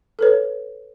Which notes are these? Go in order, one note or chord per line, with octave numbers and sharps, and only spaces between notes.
A4 B4 C#5